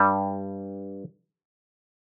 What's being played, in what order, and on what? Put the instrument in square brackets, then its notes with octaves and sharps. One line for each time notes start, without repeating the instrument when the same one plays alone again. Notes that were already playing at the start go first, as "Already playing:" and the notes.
Already playing: [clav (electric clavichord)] G2 G3